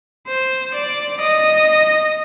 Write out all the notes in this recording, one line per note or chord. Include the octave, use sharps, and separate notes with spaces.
C5
D5
D#5